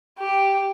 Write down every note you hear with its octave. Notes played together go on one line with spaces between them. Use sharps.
G4